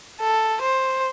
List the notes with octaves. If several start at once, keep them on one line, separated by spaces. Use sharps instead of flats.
A4
C5